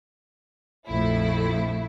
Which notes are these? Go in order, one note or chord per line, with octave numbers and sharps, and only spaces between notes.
A#1 F2 F3 A3 E4